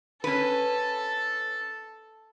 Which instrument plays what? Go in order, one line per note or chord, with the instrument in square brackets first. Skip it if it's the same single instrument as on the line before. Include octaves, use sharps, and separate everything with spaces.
[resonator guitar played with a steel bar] C#4 B4 [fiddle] A4